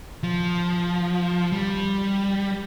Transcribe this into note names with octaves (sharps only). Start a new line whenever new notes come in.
F3
G3